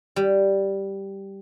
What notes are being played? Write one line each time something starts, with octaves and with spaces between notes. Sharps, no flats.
G3